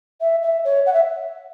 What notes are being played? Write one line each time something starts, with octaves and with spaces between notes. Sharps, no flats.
E5
E5
C#5
F#5
E5